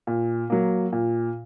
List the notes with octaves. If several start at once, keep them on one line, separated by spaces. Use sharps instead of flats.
A#2
F#3 A#3
A#2